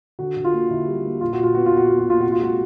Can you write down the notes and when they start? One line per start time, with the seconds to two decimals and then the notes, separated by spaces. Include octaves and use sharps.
0.19 D3 F#4
0.37 D3
0.45 F4
0.53 A#3
0.70 D3 E4
0.87 G3
1.05 A#3
1.21 A#2 F4
1.33 A#2 F#4
1.43 F4
1.55 B3 F#4
1.66 F4
1.73 A#2 F#4
1.88 A#2 F4
1.99 F#4
2.07 A#2 F4
2.21 C3 F#4
2.32 F4
2.40 G#3 F#4